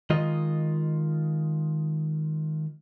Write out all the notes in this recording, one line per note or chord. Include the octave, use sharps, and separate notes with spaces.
D#3 G#3 F4 D#5